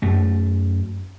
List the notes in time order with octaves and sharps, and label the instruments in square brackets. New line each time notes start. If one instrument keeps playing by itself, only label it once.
[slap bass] F#2 A3